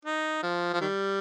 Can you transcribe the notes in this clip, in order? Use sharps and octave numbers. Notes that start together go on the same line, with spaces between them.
D#4
F3
F3
D#3 G3